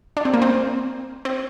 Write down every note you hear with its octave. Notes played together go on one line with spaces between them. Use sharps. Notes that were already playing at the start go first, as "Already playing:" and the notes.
D4
C4
A#3
C4
C4